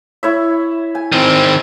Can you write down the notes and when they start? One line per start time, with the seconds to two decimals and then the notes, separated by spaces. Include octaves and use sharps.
0.23 E4 C#5 E5
0.95 G#5
1.12 D#3 C4